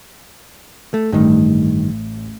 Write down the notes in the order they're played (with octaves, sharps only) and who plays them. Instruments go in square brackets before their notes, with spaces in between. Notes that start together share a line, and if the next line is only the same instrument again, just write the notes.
[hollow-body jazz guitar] A3
[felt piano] A1 [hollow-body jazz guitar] G2 D#3